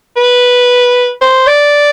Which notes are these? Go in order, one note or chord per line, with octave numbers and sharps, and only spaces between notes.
B4
C5
D5